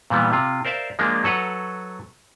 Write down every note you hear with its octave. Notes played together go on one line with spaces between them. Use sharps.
A#2 E3 G3 B3
C3 F4
A#4 C5 D5 E5 F5
F3 G#3 A#3 D4
F#3 A4 B4 F#5 A#5